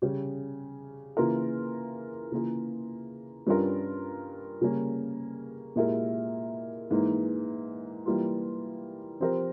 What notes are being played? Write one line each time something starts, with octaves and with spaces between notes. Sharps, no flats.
C#3 G3 C#4 G4
C#3 E3 A#3 F4 A#4
C#3 E3 A#3 F4 G#4
G2 G3 C#4 F4 A#4
C#3 G3 A#3 C#4
A#2 G#3 E4 G4 A#4
G#2 E3 A#3
E3 G3 A#3 F4
F3 C4 G4 A#4